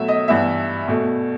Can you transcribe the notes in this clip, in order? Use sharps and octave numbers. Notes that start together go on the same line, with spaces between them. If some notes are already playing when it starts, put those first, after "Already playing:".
Already playing: B2 F#3 A3 E5
D#5
G2 E3 B3 E5
B2 A3